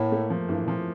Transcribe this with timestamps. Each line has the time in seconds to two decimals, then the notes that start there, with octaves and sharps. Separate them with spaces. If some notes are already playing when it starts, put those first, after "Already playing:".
Already playing: A2 A#3
0.12 A3
0.30 F3
0.49 G2 E3
0.63 A#2 F3